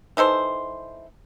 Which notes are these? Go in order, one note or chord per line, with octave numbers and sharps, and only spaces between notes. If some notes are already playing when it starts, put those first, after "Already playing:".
E3 D#4 A4 C5